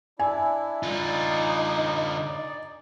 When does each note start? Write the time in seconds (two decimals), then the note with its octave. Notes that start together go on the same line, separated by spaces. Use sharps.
0.19 D4 E4 G#5
0.83 D3 D#4 F4 D5